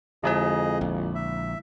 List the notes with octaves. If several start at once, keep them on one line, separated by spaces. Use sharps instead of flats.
F2 D3 G#3 E4 G#4 D#5
A#1
E5